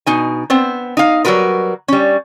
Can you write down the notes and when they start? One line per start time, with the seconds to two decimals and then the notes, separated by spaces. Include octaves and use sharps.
0.06 B2 D#4 G#5
0.50 B3 C4 C5
0.97 D#4 F5
1.25 F#3 G3 F#4 A#4 B4
1.88 G3 C#4